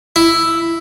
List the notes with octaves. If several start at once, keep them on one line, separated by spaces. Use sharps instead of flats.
E4